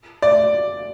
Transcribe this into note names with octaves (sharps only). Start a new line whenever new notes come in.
D5